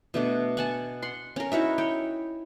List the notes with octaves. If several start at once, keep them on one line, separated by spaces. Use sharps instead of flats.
B2 A3 D4
F#5 G#5 A5
F#5 C6
C#4 A#4
D#4 E4 F#4 E5
C#5 G5